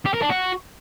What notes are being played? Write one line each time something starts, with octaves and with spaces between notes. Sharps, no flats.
G4
A#4
D4
F#4